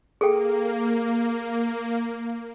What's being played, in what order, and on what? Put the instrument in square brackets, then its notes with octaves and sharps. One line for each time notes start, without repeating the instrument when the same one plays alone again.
[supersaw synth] A#3 [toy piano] G#4 A4 G5